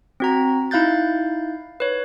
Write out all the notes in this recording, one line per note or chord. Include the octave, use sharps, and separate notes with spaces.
C4 F#4 A#5
D#4 E4 F5 F#6 G6 A6
B4 C#5